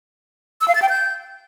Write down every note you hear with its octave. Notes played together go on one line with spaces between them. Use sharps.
E6
F5
A6
G5
G6